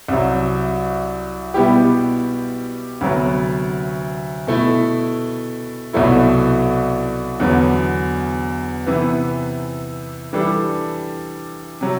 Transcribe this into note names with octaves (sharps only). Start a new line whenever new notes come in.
C2 C3 F#3
B2 G3 B3 E4 G4
D2 C3 F#3 B3
B2 A3 E4
C2 B2 F#3 A3 E4
E2 D3 F#3 B3
C3 E3 B3
E3 G3 D4 A4
C3 F#3